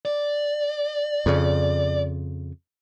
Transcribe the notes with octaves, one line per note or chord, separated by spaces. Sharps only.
D5
F2 C#3